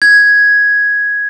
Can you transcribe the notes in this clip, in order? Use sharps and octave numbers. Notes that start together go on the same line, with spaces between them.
G#6